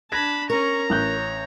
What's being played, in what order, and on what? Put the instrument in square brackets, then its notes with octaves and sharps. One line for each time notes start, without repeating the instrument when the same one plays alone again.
[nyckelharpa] D4 A5 [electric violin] B5 [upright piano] F#6 G#6 A#6
[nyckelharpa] C#4 C#6 [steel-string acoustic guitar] A#4 [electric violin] A#5
[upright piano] A1 F#6 G6 [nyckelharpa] C#5